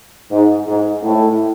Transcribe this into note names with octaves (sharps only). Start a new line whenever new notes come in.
G#2
G#2
A2